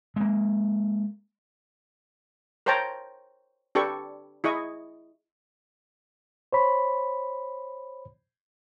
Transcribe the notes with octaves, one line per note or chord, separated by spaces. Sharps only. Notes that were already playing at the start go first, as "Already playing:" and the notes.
G#3 A#3
A#4 C5 C#5 G5 A5 A#5
D4 G4 A4 B4 C#6
E4 G#4 D#5 C#6
C5 C#5 B5